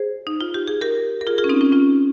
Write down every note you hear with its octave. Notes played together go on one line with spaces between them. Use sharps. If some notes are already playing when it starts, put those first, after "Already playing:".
Already playing: G#4 C5
D#4
F4
G4
G#4
G4 A#4
A#4
F4 G#4
F4 G#4
C#4
C4 D#4
C#4 F4
C#4 F4